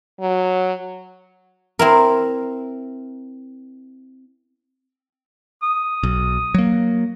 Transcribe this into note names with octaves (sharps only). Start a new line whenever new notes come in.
F#3
C4 E4 A#4
D#6
B1
F#3 A#3